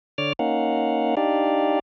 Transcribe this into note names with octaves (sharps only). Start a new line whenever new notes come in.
D3 C#5 D5 D6 F6
A#3 C#4 D#4 F5 F#5
D4 D#4 G4 D5 F5